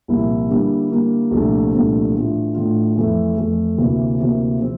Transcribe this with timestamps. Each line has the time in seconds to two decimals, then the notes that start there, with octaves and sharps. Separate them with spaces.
0.08 C2 A#2 F3 A#3 E4
0.49 D3 G3 A#3 E4
0.90 D3 G3 A#3 E4
1.31 C2 A#2 F3 A3 D4
1.72 C2 A#2 F3 A3 D4
2.13 A2 E3 A3 D4 F4
2.55 A2 E3 A3 D4 F4
2.96 F2 E3 A3
3.37 F2 E3 A3
3.78 D2 C3 E3 A#3
4.19 D2 C3 E3 A#3
4.60 C3 F3 C4